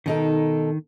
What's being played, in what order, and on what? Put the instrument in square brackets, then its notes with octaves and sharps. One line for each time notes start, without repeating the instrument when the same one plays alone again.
[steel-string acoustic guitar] B2 D#4 A4 [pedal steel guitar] D#3